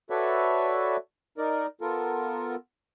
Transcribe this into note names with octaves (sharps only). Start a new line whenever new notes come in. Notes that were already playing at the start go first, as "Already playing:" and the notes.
F#4 A4 B4 C#5 D5 E5
D#4 A#4 D5
B3 F4 A4 A#4